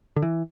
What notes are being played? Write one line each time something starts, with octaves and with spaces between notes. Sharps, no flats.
D3
E3